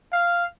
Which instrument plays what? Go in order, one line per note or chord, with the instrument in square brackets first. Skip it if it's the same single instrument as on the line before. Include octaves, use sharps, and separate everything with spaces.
[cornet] F5